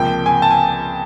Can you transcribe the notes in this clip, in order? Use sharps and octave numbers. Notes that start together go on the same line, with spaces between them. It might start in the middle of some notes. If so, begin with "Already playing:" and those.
Already playing: C#2 C3 F3 A#3 G5
G#5
A5
G#5